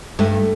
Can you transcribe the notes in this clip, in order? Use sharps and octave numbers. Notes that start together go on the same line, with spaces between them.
G2 A3